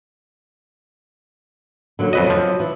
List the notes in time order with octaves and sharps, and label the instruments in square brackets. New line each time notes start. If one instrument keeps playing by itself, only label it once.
[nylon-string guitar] D3 F#3 A#3
[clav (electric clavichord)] F2 B4 D#5 [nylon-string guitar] F#3
[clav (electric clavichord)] F3
[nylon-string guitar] E3